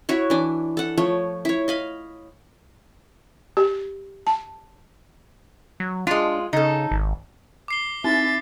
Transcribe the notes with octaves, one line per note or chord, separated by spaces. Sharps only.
E4 F#4 C#5
E3 D4
A4 F#5
F3 A3 C#5
E4 C#5
D#5 F5 B5
G4
A5
F#3
G#3 D4 F4
C#3 D#4 A4
G#1
D6 C7 G7
C4 D#4 E5 A6